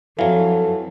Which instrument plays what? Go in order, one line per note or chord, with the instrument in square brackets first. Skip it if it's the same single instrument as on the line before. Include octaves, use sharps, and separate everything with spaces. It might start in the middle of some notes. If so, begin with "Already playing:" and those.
[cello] F2 [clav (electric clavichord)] E3 F#3 [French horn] A4 [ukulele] F5